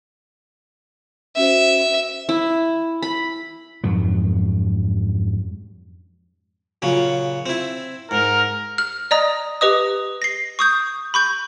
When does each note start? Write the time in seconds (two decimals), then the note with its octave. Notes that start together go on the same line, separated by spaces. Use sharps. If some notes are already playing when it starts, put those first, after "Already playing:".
1.37 C#4 F#4 C5 E5
2.29 E4
3.02 B5
3.84 F2 G#2 F#3
6.82 A#2 C#3 F#3
7.46 C4 E4
8.11 G#2 A#4
8.78 F6
9.11 D5 D#5 A#5 D#6
9.61 G4 B4 D#5 D#6
10.22 A#6 C7
10.59 C#6 D#6 G6
11.14 B5 C#6 G6